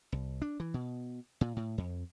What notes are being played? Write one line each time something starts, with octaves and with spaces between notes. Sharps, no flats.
C2
D4
E3
B2
A#2
A2
F2